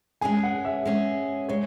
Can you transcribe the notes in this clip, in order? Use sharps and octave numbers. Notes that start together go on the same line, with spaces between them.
G#3 C#4 G#4 G#5
F#5
E5
G#3 C#4 G#4
G#3 C#5